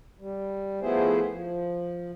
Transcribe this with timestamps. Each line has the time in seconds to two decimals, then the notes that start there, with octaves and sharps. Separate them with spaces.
0.20 G3
0.81 F3 A3 B3 E4 G#4 C5
1.32 F3